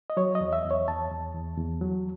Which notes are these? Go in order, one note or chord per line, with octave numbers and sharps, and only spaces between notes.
D#5
F#3 C#5
D#5
E2
E5
E2
C#5
E2 A5
E2
E2
E2
F#3